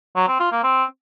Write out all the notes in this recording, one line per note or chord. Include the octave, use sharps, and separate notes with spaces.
F#3
C4
F4
A#3
C4